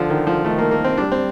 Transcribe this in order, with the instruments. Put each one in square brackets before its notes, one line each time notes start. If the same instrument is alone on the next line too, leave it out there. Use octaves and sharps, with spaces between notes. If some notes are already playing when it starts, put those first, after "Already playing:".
Already playing: [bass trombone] D3 [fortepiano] F3
[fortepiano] D#3
F3
[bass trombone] D#3 [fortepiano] A3
[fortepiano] A#3
A#3
C4
[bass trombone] G3 [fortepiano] D4
[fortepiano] C4